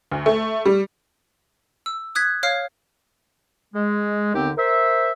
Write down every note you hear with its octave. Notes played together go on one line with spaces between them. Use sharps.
D2
A3
G3
E6
D#6 F#6 G#6 B6
C#5 F5 F6 C7
G#3
D#2 D3 B3 C4 D#4 G4
A#4 C5 E5